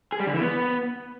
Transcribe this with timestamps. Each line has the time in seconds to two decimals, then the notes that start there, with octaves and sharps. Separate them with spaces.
0.12 G#4
0.20 G3
0.27 D3
0.34 E3
0.41 B3